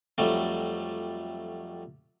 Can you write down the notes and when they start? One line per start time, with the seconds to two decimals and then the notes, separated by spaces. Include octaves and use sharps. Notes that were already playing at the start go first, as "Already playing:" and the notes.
0.18 F2 F#3 G3 A3